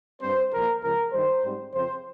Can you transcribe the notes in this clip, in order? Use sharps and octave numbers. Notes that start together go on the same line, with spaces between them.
G2 G3 C4 C5
C2 A#2 F3 A#3 A#4
C#2 C#3 F3 A#4
G2 D#3 G3 C5
G#2 G3 C4
F2 C#3 F3 C4 C5